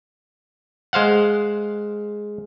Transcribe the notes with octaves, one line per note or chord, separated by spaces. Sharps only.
G#3 C5 F5 F#5